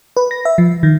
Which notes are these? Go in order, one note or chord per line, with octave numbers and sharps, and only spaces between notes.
B4
A#6
E5
F3
D#3